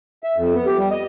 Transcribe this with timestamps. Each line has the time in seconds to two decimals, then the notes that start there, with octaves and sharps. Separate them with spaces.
0.24 E5
0.37 F2
0.55 B3
0.66 G4
0.77 G3
0.91 D#5